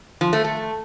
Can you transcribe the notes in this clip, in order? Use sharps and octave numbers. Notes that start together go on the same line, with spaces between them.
F3
A3
A3